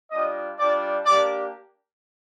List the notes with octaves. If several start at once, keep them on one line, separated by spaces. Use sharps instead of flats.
G3 D4 F4 D#5 D#6
G3 D4 F4 D5 D6
A#3 D4 G4 D5 D6